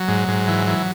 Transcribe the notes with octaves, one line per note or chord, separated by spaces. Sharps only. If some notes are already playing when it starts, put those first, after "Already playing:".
Already playing: F#3
G#2
G#2
E3
E3